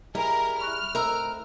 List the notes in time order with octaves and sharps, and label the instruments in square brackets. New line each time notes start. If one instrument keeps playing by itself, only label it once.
[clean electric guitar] G3 G4 G#4 [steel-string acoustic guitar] E4 [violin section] A#4 [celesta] D#5 A#5
[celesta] B5 C#6 F#6 [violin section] F6
[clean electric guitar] A3 C4 E4 [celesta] A4 D#5 E6 [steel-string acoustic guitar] A#4 A#5